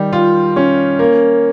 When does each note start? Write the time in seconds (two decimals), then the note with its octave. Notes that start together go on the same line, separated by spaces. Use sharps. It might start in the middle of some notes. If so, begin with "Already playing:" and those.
Already playing: D#3 G3
0.13 F4
0.56 C#4
0.99 A#3